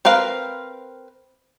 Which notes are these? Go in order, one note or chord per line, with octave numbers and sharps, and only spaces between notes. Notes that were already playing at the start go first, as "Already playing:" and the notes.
C4 A#4 B4 F5